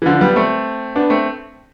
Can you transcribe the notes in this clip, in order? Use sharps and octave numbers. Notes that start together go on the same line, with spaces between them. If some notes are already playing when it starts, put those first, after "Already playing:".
E3
D3 F3
G3 B3
A3 C4
B3 D4
A3 C4